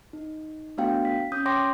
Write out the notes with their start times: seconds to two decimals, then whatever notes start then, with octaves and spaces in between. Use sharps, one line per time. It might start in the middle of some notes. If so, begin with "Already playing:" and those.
0.13 D#4
0.78 A3 B3 D4 F#4 F5 G5
1.05 B6
1.32 C#4 D#6 G6
1.45 C#5 G5 C6 D6 A#6